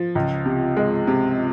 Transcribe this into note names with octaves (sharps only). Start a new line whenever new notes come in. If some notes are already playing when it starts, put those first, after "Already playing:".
Already playing: F3
C#2
C3
G#3
C3